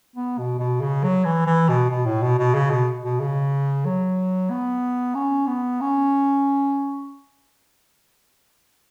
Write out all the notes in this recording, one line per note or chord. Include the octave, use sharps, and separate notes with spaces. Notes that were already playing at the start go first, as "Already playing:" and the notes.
B3
B2
B2
C#3
F#3
E3
E3
B2
B2
A2
B2
B2
C#3
B2
B2
C#3
F#3
B3
C#4
B3
C#4